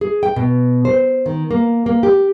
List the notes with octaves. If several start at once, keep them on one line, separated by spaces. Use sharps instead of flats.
G#4
G5
B2
C5
D#3
A#3
A#3
G4